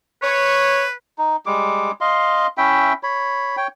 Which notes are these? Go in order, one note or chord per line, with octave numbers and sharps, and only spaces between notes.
B4 C#5
D#4
G3 G#3 D6
D#5 F5 C6
C#4 E4 E5 G5
C#5 B5
C#5 G5